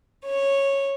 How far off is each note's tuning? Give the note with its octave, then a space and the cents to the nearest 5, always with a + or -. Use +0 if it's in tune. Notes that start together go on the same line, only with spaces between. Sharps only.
C#5 -10